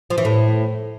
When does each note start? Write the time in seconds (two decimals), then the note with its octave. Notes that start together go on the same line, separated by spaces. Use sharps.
0.10 F3
0.18 E3
0.25 A2